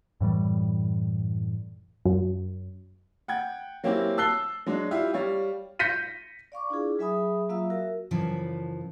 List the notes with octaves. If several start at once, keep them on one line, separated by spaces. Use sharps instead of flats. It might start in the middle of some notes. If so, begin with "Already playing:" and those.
F#2 A2 E3 G3
F#2
F#5 G5 G#6
F#3 A#3 C4 C#4 E4 G4
A5 E6 F#6 C7 G7
F#3 G#3 D4
E4 F4 G4 E5 F5
G3 C#5 F5
G6 A#6 B6 C#7 D#7
D5 F5 C#6 D6
D4 E4 F4 G#4
F#3 G#4 E5 G#5 B5 D#6
F#3 A#3 F4 E5 F5 E6
F#4 A#4 E5
F#2 C#3 E3 F3